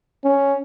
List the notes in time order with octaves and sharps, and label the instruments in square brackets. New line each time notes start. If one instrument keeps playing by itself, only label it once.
[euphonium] C#4